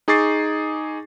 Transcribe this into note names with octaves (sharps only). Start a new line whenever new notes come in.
D#4 G#4 C#6 D6 A6 C7